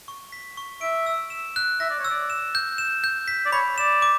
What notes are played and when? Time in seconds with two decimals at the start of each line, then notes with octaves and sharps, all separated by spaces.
0.08 C#6
0.32 B6
0.57 C#6
0.81 E5 D7
1.07 E6
1.30 E7
1.56 F#6
1.80 E5 A#6
1.90 D5
1.99 C#5
2.05 E6
2.10 D5
2.30 E7
2.55 G6
2.78 E7
3.04 G6
3.28 B6
3.45 D5
3.52 C#5 B5
3.78 D5 E7
4.02 D6